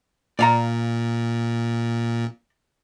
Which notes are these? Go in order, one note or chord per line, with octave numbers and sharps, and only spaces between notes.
A#2 D5 F5 A#5